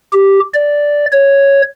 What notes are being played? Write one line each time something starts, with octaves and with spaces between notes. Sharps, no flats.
G4
D5
C#5